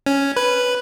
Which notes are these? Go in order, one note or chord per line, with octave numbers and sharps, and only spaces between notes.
C#4
B4